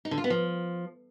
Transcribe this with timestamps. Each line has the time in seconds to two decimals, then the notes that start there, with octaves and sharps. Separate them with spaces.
0.05 D#4
0.11 D3
0.18 F4
0.24 B3
0.30 F3